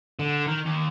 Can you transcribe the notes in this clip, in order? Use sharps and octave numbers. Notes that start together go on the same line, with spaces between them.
D3
D#3
D#2